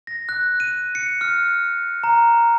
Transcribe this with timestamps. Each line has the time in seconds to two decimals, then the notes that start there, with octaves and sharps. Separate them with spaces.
0.07 A#6
0.29 F#6
0.60 D#7
0.95 C#7
1.21 F6
2.04 A#5